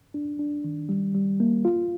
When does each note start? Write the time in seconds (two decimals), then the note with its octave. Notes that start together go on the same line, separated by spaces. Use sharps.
0.14 D4
0.39 D4
0.64 D#3
0.89 G3
1.14 G3
1.40 A#3
1.65 F4